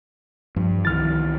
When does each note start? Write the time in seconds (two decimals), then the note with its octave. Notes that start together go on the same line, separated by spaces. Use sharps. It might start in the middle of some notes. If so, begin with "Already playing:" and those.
0.56 G2 F3
0.85 C2 D#3 E3 F6 A6